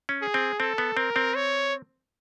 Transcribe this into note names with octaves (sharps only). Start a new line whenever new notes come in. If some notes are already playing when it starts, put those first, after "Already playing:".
C#4
G#4
C4
C4 A4
B3
C4 A#4
C4
C#5